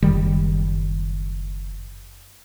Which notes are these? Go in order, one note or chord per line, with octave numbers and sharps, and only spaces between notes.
F#1 D#3 G3